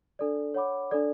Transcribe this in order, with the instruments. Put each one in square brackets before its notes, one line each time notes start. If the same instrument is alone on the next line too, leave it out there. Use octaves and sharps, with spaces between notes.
[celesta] D4 A4 D5
C#5 F#5 B5 D6
D4 A4 D5